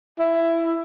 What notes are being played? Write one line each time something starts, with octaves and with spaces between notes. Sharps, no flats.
E4